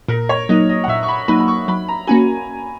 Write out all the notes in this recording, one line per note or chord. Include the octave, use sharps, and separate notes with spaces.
A#2 A#4
C#5
F#3 A#3 D#4 D#5
D#5
F#5
A#2 E5
C#6
B5
F#3 A#3 D#4 B5
B5
C#6
F#3 B5
A#5
A#3 C#4 F#4 G#5